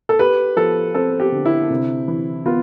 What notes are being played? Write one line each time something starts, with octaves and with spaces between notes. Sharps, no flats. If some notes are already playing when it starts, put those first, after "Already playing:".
A4
G4 B4
F3 A4
C4 A4
G4
D3
E4
C3
E3
B3 F4